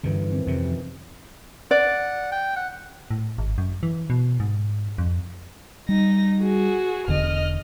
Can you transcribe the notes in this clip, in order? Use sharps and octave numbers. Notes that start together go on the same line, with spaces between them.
G2 D3 E3 C#4
D#3 C4
F2 C3
F3
D5 F#5
G5
F#5
A2
G#1
F#2
E3
B2
G#2
F2
G3 D#4 A#6
F#4 G#4
E1 E2 D3 D#5 F6